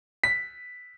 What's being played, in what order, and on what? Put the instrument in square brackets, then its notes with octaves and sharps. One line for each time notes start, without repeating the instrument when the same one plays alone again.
[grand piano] B6